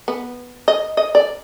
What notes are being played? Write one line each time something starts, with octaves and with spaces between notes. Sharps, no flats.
B3
D#5
D#5
D5